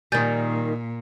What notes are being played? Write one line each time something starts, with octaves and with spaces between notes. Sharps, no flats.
A#2 D#3 G3 G#5 G6 A6